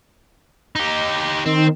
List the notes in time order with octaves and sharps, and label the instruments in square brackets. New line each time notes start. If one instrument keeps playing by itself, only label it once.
[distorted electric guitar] D#4 G4
[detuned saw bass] D#3 [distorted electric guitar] C4